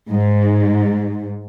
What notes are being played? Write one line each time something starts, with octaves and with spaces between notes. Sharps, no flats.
G#2